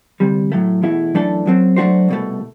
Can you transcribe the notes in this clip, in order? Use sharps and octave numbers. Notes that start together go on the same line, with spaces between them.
D2 C3 G3
A2 F#3 A3
E2 B2 A3 E4
F#2 E3 A3 D4 A4
F#2 F#3 C4
F#3 A3 D4 F#4 C5
C2 B2 A3